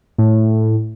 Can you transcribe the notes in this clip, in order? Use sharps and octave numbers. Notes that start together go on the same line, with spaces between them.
A2